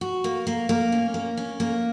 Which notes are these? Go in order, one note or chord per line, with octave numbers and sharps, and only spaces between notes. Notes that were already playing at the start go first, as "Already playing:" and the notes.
F#4
A#3
A#3
A#3
C#4
A#3
C#4
A#3